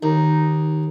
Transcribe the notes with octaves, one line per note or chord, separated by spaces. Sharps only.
D#2 D#4